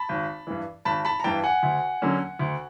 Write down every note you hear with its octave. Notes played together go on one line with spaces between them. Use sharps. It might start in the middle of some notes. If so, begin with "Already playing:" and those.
Already playing: A5 B5
G#1
G2 E3
G#1 A5 B5
A5 B5
A#5
G2 E3 G5 A5
F#5 G#5
D2
D3 F#3 A#3 C#4
D2